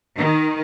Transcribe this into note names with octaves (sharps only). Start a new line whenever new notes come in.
D#3